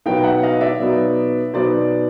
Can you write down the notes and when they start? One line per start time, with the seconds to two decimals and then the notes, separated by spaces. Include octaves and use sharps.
0.06 B2 F#3 B3 D#4 F5 G5
0.24 E5 F#5
0.43 D#5 F5
0.61 D5 E5
0.80 B2 F#3 B3 D#4
1.54 B2 F#3 B3 D#4 C5 D5